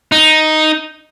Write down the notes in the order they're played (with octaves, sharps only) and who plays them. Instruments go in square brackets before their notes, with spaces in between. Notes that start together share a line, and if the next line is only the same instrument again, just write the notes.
[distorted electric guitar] D#4